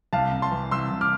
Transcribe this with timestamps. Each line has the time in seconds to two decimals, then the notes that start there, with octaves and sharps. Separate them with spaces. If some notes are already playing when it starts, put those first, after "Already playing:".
0.13 C2 F5 A5
0.32 C2
0.42 A5 C6
0.52 E3
0.71 C2 C6 E6
0.91 C2
1.01 D6 F6